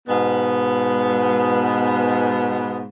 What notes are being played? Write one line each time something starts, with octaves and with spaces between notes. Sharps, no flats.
G#2 B2 B3